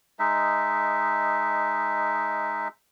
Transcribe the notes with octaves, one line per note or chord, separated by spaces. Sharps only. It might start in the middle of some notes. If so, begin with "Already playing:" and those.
G#3 D#4 E5